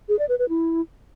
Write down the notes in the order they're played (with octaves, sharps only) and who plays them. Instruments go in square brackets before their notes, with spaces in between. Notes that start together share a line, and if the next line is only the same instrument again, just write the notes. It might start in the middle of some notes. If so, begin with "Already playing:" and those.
[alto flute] G#4
D5
B4
B4
E4